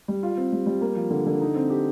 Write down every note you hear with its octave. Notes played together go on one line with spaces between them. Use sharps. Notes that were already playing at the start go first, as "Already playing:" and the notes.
G3
F4
C4
G3
G3
A#3
F3
D3
D3
D#4
C4
G4